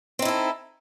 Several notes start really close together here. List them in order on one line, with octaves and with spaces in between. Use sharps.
C4 D#4 E4 A4